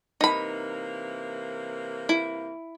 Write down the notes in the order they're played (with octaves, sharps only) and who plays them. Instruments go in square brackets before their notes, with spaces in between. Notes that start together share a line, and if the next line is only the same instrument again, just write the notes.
[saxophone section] C3 E3 A#3 [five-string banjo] D#4 B5
[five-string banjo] E4